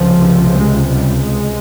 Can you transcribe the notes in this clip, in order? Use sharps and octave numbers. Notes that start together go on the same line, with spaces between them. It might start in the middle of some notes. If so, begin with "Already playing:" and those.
Already playing: C#2 C3 F3
G#3
G3
G#3